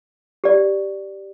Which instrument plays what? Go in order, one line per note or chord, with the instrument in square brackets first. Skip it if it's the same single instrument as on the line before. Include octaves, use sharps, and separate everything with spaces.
[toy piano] G4 D5